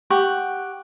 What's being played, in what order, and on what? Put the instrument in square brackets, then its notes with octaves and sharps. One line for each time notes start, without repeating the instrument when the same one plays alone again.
[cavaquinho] G4 F#5 C#6